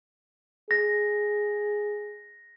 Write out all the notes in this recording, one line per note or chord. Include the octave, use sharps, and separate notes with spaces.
G#4 A#6